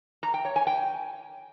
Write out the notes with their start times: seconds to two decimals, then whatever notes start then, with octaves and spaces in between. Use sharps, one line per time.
0.23 A#5
0.34 G5
0.45 C#5
0.56 G#5
0.67 G5